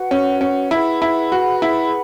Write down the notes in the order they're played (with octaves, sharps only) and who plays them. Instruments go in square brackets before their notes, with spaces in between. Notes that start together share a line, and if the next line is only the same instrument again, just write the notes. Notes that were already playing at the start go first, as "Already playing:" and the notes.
Already playing: [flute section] F#4 B4 F#5
[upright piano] C#4
C#4
[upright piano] E4 [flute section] G#4 B4 F#5 B5
[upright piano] E4
F#4
E4